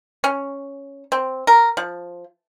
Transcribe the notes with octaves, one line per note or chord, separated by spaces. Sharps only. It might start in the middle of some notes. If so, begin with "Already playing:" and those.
C#4
C4
A#4
F3